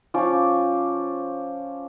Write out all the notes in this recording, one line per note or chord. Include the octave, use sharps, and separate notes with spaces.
F3 C#4 D6